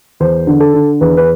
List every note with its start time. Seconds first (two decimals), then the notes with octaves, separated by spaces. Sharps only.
0.20 E2 C5
0.47 D3
0.60 A4
0.74 D3
1.01 E2 B4
1.17 B4